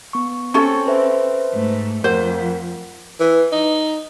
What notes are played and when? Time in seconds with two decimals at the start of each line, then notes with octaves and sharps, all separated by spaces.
0.13 B3 C#6
0.54 C4 C#4 A4 C#6
0.87 B4 C5 E5
1.53 G#2 A3
2.04 F2 A#4 C5 F#5
3.20 E3
3.52 D#4